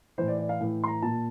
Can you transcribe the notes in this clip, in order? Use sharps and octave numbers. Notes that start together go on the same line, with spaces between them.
A2 E3 C5
D5
D5
F5
A2 E3
C6
A#5
A#2 A5